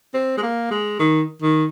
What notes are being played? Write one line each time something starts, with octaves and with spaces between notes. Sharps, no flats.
C4
G#3
A#3
G#3
D#3
D#3